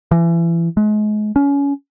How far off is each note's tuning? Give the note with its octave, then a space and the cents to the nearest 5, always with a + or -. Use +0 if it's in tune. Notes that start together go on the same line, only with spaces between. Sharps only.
E3 +30
G#3 +35
C#4 +25